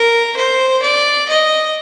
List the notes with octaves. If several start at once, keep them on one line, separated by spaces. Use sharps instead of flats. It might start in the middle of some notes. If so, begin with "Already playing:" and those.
Already playing: A#4
C5
D5
D#5